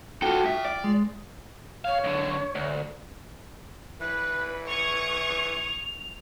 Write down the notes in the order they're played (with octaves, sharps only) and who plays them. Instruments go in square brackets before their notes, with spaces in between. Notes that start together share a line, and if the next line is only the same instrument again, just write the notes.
[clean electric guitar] F4 G5 [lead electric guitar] F#4 A4
[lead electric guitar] G2 E5
D5
[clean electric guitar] G#3
[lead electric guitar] B2 F5 [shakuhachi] C#5
[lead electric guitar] B1 D3
D2
[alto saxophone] E3 [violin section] B4 B5 [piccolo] F#6
[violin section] C#6 D#6 G#6 [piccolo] F7